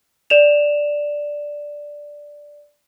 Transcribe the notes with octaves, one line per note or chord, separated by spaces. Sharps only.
D5 E7 F7